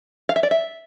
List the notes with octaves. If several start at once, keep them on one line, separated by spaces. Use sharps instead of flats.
F5
E5
D5
E5